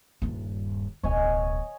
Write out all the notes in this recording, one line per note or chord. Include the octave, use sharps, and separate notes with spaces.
D#1 G2
D1 B1 C#5 D#5 G#5